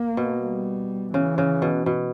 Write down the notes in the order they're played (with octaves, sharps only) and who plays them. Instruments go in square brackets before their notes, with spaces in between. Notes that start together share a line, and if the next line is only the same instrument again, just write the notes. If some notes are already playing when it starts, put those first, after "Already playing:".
Already playing: [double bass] A#3
[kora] B2
[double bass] G3
[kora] C#3 [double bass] E3
[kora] C#3
B2
B2